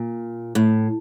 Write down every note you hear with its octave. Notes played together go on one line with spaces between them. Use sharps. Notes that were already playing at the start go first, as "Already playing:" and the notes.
Already playing: A#2
A2